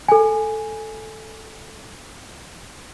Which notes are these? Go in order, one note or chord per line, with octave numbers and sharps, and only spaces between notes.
A4 G#5